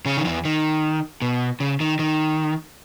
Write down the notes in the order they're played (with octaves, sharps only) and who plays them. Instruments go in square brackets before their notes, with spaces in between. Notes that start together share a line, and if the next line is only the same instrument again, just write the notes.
[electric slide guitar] C#3 C#4
D#3
E2 E3
D#3
B2
C#3
D#3
D#3